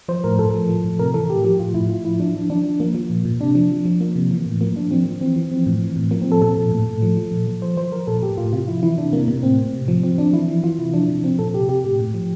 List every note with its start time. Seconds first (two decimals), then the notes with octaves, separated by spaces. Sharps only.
0.09 F3 C5
0.24 A2 A#4
0.39 A2 A4
0.54 F3
0.69 F3
0.84 A2
0.99 C3 A#4
1.14 E3 A4
1.29 A2 G4
1.44 F3 G4
1.59 A2 F4
1.74 A2 E4
1.90 A2 F4
2.04 F3 E4
2.20 F3 D4
2.35 F3 D4
2.50 F3 D4
2.64 F3
2.80 F3 A#3
2.95 F3
3.10 A#2
3.25 A#2
3.40 C3 D4
3.55 F3
3.71 F3
3.85 F3
4.00 F3 A#3
4.16 C3
4.31 E3
4.46 A2
4.61 F3 A#3
4.76 F3 D4
4.91 F3 C4
5.06 F3
5.21 E3 C4
5.36 E3
5.51 F3 C4
5.66 A2
5.81 E3
5.96 A2
6.11 F3 A#3
6.22 F3 C4
6.32 A4
6.42 A#2 A4
6.57 A#2
6.72 A2
6.87 A2
7.02 F3
7.17 F3
7.32 A#2
7.47 F3
7.62 F3 C5
7.77 F3 C5
7.92 F3 A#4
8.07 A#2 A4
8.23 A2 G4
8.37 A2 F4
8.52 C3 F4
8.67 F3 E4
8.83 E3 E4
8.98 C3 D4
9.13 C3 A#3
9.28 C3 A#3
9.43 A2 C4
9.58 A2
9.73 C3
9.88 F3
10.03 F3 C4
10.18 F3 D4
10.33 E3 E4
10.48 E3
10.63 E3 F4
10.79 C3 E4
10.93 F3 D4
11.09 C3
11.24 F3 C4
11.39 A#2 A4
11.54 C3 G4
11.69 C3 G4
11.84 A2 G4
11.99 A2
12.14 F3